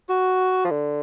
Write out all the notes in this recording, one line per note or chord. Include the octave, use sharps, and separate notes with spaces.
F#4
F3
D3